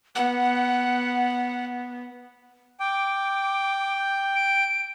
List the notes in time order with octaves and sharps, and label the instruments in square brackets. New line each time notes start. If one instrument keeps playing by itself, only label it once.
[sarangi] B3 [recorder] F#5
[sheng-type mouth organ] G5 [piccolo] D6
[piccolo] G6
D7